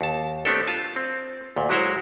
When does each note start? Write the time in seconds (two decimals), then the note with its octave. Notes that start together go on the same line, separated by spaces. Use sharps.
0.01 D#2 A5
0.45 A3 B3 C4 D4 G4 A4
0.67 F4 A5
0.96 C4
1.56 D2 A#2
1.69 F#3 G#3 E4 F#4 C5 C#5